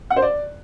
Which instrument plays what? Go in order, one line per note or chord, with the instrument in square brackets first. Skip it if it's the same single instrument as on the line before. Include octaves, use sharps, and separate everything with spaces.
[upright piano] F#5
C5
D5